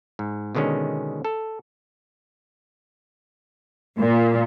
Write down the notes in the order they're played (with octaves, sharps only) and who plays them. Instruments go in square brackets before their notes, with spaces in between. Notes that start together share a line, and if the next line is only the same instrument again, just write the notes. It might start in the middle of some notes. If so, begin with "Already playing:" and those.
[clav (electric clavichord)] G#2
B2 D3 D#3 G#3 C#4
A4
[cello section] A#2